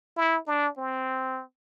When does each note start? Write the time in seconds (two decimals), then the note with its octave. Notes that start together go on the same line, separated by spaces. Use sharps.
0.17 E4
0.47 D4
0.78 C4